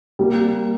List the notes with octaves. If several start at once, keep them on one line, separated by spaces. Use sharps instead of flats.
G3 A#3 G4 A#4